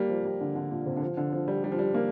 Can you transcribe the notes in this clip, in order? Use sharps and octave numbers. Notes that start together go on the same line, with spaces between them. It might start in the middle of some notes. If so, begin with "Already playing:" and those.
Already playing: G3 A#3
F3
G3
D3
D3
A#2
C3
D3
F3
D3
F3
G3
G3
F3
G3
A#3